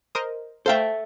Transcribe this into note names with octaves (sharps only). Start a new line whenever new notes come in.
A#4 C5 D#5
A4 C5 E5 F5 G5